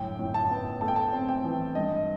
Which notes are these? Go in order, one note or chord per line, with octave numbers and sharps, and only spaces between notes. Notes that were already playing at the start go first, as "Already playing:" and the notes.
Already playing: G1 F#2 A2 G5
A2
A5
B3
A3 A5
G5
A5
C4
G5
E3
G2 D#5